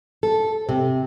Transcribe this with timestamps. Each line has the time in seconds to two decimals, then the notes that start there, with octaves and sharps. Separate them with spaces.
0.23 A4
0.69 C3